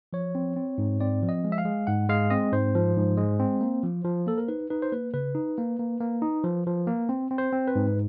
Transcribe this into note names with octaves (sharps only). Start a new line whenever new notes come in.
F3 C#5
C4
C4
G#2
C4 D5
F3
D#5
G#3
E5
F5
G#3
G#2 F#5
G#3 F5
C4 D#5
G#2 C5
F3
G#2
G#3
C4
A#3
F3
F3
A#3 A4
A#4
D#4 B4
D#4 B4
C5
A#3 B4
C#3 B4
D#4
A#3
A#3
A#3
D#4
F3
F3
A#3
C4
C4
C5
C4
B4
G#2